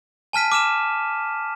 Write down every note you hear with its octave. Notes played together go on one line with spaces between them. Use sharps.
G#5 A5 F6 B6 D#7
D6 F6 E7